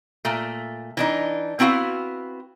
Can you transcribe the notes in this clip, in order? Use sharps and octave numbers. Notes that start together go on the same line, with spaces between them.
A#2 A3
E3 D4 D#4
B3 C4 E4 F#4 F5